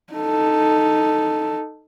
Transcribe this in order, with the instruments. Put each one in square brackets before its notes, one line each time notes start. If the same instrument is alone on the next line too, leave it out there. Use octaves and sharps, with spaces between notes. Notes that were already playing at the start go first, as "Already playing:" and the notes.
[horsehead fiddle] D#4 A4